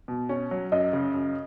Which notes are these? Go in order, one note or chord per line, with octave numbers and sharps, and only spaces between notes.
B2
C#4
F#3
F#2 D#5
C#3
F#2